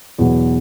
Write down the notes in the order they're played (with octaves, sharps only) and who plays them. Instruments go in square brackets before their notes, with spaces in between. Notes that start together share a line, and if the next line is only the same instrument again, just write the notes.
[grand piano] E2 B2 F#3